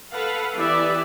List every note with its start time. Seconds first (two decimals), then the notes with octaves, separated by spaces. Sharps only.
0.11 A4 B4 F5 F#5
0.54 E3 B3 G4 B4 D5 E5